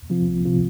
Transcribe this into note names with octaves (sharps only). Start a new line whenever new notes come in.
C3 F3 C4 F4
C2
C3 F3 C4 F4